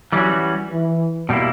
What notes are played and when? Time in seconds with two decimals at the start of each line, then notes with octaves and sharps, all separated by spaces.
0.12 E3 F#3 G3 A#3 C#4 F#4
0.71 E3
1.29 B2 G3 A#3 E4